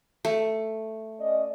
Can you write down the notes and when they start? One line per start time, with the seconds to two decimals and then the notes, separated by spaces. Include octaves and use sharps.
0.25 A3
1.20 C#4 D5 D#5